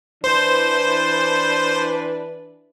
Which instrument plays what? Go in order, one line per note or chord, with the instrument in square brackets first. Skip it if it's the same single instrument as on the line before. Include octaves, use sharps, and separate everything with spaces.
[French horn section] E3 D4 B4 [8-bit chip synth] C5